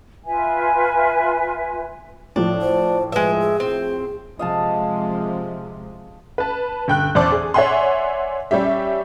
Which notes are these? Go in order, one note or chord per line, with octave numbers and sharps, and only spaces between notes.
F4 B4 E5 G#5
A2 F3 D4
C5
G#3 B4 E5
G#4
C4
C3 F3 G#3 D#5 F5 A5
B4 A5
G1 G5 F#6
E2 C5 D5 A5 D6
G#4
C#5 D5 E5 F#5 G#5 C6
G3 C#4 G4 E5